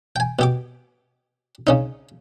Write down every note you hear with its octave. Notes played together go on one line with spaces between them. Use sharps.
G5 G#5
B2 G4 D6
C#3 C#4 D#4